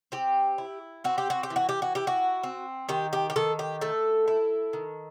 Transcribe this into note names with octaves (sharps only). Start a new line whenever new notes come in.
C4 G4
E4
C4 F#4
G4
F#4
G4
E3
F#4
G4
F#4
E4 G4
F#4
C4
D#3 G4
G4
G4
D#3 A4
G4
A3 A4
E4
D#3